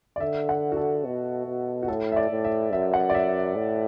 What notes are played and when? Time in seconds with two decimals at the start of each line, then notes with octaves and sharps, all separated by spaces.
0.16 D5
0.20 D3 E5
0.49 F#5
0.72 F#4
0.77 A4
1.05 B2
1.46 B2
1.83 F#4
1.88 A2 A4
2.12 E5
2.16 D5
2.31 A2
2.44 E5
2.73 F#2 E5
2.94 F#5
3.10 D5
3.14 E5
3.56 A2